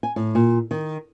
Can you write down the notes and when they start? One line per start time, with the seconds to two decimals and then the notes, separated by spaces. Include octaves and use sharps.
0.03 G#5
0.16 A2
0.35 A#2
0.71 D#3